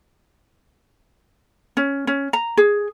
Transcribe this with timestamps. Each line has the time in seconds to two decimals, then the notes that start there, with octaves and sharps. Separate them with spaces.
1.77 C#4
2.07 C#4
2.33 A#5
2.57 G#4